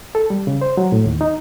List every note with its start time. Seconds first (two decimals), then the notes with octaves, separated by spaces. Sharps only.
0.15 A4
0.30 G3
0.47 C#3
0.62 C5
0.77 F#3
0.92 A2
1.06 D#2
1.21 D#4